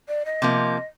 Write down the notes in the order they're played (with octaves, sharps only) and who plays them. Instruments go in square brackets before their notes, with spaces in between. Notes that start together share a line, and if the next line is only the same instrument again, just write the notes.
[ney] D5
D#5
[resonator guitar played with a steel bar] C3 F3 A#3